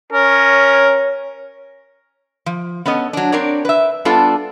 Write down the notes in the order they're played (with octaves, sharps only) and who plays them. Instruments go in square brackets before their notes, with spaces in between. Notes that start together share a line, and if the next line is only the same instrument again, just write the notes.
[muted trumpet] C#4 [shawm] A#4 [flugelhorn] C#5
[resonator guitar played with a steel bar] F3
B3 C#4 A4 D#5
F#3 D4
C4 D4 A#4 C#5 D5
B4 E5
G3 B3 D4 F4 A4